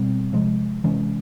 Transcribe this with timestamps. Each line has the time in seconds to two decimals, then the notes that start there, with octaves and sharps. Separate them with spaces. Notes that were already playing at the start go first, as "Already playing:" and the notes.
Already playing: B2 G3 C4
0.33 C3 F3 G#3
0.84 C3 E3 G#3 C#4